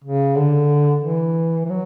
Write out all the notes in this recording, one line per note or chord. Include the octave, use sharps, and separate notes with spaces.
C#3
D3
E3
E3
F#3